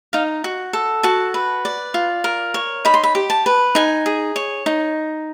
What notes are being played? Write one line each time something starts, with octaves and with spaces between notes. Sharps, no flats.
D#4 F5
F#4
A4
F#4 A5
B4
D5
F4
A#4
C#5
D#4 B5
C6
B5
G4
A5
B4
D#4 G#5
G#4
C#5
D#4